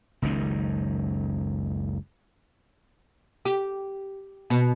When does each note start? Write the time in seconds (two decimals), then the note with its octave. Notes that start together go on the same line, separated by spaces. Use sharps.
0.22 F#1 C#2 F#2 D#3
3.45 G4
4.50 B2